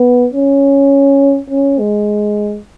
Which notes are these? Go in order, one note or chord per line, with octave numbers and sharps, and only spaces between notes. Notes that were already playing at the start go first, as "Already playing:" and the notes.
Already playing: B3
C#4
C#4
G#3